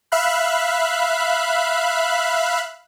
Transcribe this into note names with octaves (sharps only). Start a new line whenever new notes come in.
E5 F5 B5 F#6